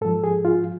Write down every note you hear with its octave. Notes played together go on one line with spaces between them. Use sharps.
G#2 F3 A4
G#4
F4